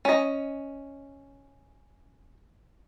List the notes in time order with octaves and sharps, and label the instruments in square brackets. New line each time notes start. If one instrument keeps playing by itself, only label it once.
[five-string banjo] C#4 D#5